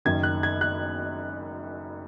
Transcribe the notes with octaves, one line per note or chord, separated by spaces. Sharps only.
F#1 F#2 D#3 G#6
F#6
G#6
F#6